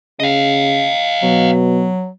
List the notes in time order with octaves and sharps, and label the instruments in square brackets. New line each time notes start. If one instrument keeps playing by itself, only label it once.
[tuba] C#3 [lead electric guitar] D#5 F5
[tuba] B2 [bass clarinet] F#3